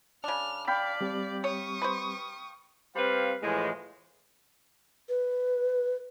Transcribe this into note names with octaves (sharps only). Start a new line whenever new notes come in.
C#3 D4 F6
D5 F5 G5 B5
G3 C4 G4
C#5 C#6 D#6
B4 C5
G3 C4 B4 C5 F5
A2 E3 F3 G#3
B4